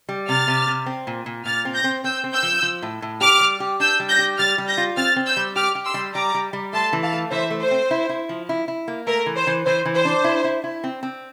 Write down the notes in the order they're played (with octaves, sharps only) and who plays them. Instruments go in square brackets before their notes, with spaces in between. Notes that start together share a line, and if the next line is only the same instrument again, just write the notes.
[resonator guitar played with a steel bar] G3
[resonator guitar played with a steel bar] C3 [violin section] F6 A6
[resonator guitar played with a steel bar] C3
C3
C4
A#2
A#2
[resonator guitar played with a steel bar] A#2 [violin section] F6 A6
[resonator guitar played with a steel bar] C4
[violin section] G6 A#6
[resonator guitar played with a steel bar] C4
[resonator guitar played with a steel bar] C4 [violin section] E6 G6
[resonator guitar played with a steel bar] C4
[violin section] E6 G6
[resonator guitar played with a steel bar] F3
F3
A2
A2
[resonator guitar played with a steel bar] G4 [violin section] D6 F6
[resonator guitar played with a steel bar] G3
G4
[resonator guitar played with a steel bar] D4 [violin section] E6 G6
[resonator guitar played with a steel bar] G3
[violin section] G6 A#6
[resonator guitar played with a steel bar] G4
[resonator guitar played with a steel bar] G3 [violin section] F6 A6
[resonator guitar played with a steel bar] G3
[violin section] G6 A#6
[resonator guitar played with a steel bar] F4
[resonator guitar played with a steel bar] C4 [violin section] F6 A6
[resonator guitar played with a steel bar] C4
[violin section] E6 G6
[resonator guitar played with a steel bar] G3
[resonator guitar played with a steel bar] G4 [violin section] D6 F6
[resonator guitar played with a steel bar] G4
[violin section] C6 E6
[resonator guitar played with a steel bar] G3
[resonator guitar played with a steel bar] G3 [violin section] A#5 D6
[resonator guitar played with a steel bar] G3
G3
[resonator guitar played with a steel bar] A3 [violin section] A5 C6
[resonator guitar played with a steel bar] E3
[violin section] F5 A5
[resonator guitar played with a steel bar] A3
[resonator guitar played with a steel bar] E3 [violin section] C5 E5
[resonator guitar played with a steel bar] A3
[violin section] C5
[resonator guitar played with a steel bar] C4
E4
E4
F3
E4
E4
A#3
[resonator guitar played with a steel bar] A3 [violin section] A#4
[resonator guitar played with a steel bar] E3
[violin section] C5
[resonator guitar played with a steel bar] E3
[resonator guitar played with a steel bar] E3 [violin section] C5
[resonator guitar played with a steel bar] E3
[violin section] C5
[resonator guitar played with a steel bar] D4
E4
E4
E4
C4
C4